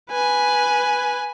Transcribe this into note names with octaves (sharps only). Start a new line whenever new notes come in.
B4 G#5